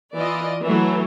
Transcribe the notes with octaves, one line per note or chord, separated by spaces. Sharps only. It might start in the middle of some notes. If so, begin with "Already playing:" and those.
E3 F4 D5 D#5
E3 F#3 A3